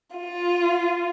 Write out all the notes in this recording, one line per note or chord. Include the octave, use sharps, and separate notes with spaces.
F4